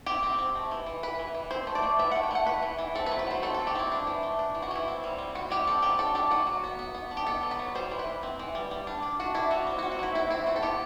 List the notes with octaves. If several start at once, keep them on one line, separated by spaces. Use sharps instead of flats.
C4 G4
C4
C4
A3
E3
E3
E3 B4
E3
E3
C4 C5
A3
D5
A3
E3 E5
A3 F#5
G5
A3 F#5
A3 B4
E3
E3
C4 A4
B4
F#3
B4
F#3 C5
C4 A4
F#3 A4
G4
C4 E4
D4
E3
A3
D4
E3
F#4
E3 E4
C4
G3
C4
C4 F#4
G3 G4
C4 A4
F#3 G4
D4 A4
D4 G4
F#3 F#4
F#3
B3
B3
B3
D4
G4
B3 A4
F#3
B4
F#3
G3 C5
E3
B4
E3
C4
E3
G3
G3
D4
D4
D4 F#4
D4 E4
G3 F#4
C4
C4 F#4
F#4
F#3 E4
C4 E4
C4 E4
C4 F#4
A4
B3 G4